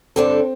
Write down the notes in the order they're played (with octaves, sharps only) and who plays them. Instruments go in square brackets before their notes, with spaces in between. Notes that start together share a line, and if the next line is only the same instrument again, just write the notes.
[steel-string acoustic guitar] G2 D3 G3 D4 A4 [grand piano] C4